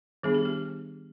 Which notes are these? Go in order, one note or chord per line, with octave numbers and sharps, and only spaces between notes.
D#3 G3 B3 D4 G#4
G4
G4